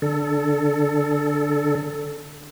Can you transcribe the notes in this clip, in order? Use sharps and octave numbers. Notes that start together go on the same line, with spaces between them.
D3 A4